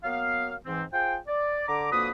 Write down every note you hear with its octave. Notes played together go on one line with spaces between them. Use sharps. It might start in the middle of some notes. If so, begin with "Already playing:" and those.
F#3 A#3 B3 F5
G#2 E3 C4
F4 G#4 C5 G5
D5
D3 A#5 D6
F2 D3 A#3 F#4 B4 D#6